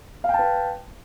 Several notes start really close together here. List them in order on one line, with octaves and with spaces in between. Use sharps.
F5 G5 A5 B4